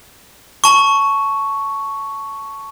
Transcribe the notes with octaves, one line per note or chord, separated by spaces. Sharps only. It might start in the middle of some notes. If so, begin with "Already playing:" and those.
A5 C#6